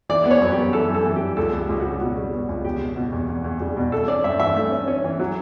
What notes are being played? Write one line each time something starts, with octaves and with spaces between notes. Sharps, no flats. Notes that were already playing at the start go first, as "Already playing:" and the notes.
E3 D5
B3 D5
C#5
F#2
B3 G4
E3 A4
F#2
A4
E3
G4
G3
C#2 A4
C#2
G4
C#2
G3 F#4
B2 F#4
G3
B3
C#2
E2 G4
B2
B2
E2
E2
E2
G3
B2
E3 A4
C#4 D5
G2 E5
E3 E5
A3
C#4
C#4
E3
F#3